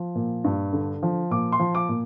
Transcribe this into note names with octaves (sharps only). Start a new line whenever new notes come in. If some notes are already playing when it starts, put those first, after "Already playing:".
Already playing: F3
A#2
G2
D3
F3
A#2 D6
C6
F3
D6
A#2